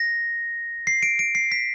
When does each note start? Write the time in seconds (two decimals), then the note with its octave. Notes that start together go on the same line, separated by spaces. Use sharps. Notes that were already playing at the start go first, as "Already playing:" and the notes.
Already playing: A#6
0.87 C7
1.03 D7
1.19 D7
1.35 C7
1.52 B6